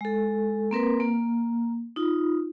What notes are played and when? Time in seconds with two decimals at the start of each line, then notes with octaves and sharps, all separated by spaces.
0.01 G#3 A4
0.71 A#3 C4 A#4 B4
1.00 A#3
1.96 D#4 F4